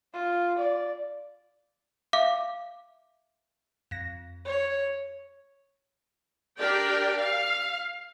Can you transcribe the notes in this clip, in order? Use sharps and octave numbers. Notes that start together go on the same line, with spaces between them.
F4
D5
E5 F5 D6
F2 A#6
C#5
D4 G4 A#4 D5 G5
F5